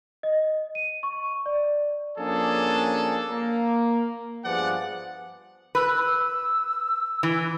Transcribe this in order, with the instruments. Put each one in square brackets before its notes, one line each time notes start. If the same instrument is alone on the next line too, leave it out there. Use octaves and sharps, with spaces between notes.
[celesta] D#5
D#7
C#6
D5
[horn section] F3 A#3 C#4 D4 G#4 A4
A#3
G2 F3 B3 G#4 D5 F#5
[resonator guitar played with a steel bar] B4 [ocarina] E6
[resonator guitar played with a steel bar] E3